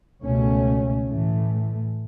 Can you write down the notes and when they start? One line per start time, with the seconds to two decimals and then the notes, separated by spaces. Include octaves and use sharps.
0.22 C#2 B2 A3 C#4
1.09 A2 E3 A3